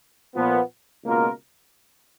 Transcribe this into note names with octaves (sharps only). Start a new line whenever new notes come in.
A#2 F3 B3
C#2 B2 A#3 F4 A#4